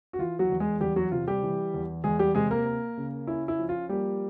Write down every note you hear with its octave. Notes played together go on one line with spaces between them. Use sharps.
F#4
E3 F4
F#3 F#4
E2
G#3 G#4
E2 G3 G4
F#3 F#4
C3 F4
G3 G4
E3
E2
E2 G#3 G#4
G3 G4
C3 G#3 G#4
A#3 A#4
A#3
C#3
C#4 E4
E4
F3
F4
G3 A#3 G4